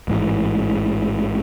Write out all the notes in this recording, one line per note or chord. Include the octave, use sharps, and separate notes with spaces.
A1 G#2 E3